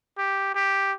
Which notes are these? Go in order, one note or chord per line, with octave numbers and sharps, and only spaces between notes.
G4
G4